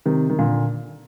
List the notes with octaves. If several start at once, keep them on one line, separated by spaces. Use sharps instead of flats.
C3 D#3
D#3
A#2 D3